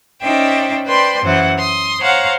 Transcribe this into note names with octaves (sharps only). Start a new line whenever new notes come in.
C#4 D#4 C5 D5 E5 G5
B4 C5 D5 G5 B5 C6
F#2 E3 F#3 C5 F#5
C6 D#6
C5 C#5 F5 F#5 A#5